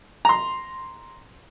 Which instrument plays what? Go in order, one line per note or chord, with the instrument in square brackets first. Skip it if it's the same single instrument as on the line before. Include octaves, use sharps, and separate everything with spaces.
[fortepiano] A#5 C6